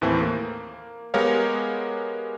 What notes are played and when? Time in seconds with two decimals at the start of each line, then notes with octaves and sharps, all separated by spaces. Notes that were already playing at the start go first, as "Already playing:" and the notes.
0.01 D#2 A2 E3 A3 C4
0.21 A#3
1.14 G#3 B3 G4 A#4 C#5 F5